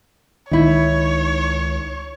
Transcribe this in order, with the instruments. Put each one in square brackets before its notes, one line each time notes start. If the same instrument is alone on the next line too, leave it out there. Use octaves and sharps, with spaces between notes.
[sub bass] C#2 [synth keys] D#3 [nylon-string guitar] D#4 E4 [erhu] C#5